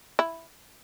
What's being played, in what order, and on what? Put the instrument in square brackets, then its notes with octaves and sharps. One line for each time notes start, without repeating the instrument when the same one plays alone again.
[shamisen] E4